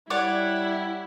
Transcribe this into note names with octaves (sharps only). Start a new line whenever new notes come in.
G3 E4 C#5 D5 F#5